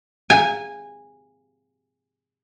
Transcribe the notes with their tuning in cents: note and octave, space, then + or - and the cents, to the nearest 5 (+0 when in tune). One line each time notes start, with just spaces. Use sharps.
G#5 -15